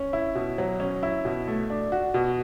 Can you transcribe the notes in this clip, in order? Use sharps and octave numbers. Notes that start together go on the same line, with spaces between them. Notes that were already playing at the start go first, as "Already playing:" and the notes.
Already playing: C#4
E4
B2
F#3
C#4
E4
B2
A3
D4
F#4
B2